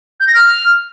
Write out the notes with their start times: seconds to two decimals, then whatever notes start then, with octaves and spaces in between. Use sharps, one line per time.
0.20 G6
0.27 A#6
0.34 F6